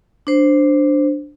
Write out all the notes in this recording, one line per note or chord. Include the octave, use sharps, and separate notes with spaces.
D4 C5